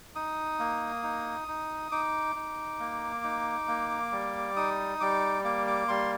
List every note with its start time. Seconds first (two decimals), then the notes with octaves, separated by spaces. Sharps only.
0.15 D#4 D#6
0.59 A#3
1.03 D#4
1.48 D#4
1.91 D#4 D6
2.36 D#4
2.80 A#3
3.23 D#4
3.68 A#3
4.12 G3
4.56 D#4 D#6
5.00 G3 D6
5.44 A#3 D6
5.67 D6
5.88 G3 C6